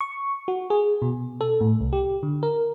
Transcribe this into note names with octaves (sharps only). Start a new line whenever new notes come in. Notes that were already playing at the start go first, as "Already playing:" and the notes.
C#6
F#4
G#4
B2
A4
A2
C2
G4
D3
A#4